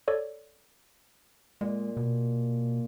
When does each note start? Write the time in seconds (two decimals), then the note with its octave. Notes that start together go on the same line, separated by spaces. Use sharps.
0.08 A4 C#5 D5
1.61 A#2 G#3
1.97 B2